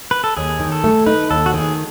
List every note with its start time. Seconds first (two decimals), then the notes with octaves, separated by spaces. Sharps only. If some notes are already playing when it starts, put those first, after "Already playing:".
0.11 B4
0.24 A4
0.37 D#2 G#4
0.60 D#3
0.72 A4
0.84 A3
1.06 D#4 B4
1.31 D#2 A4
1.46 F#4
1.54 D#3 G#4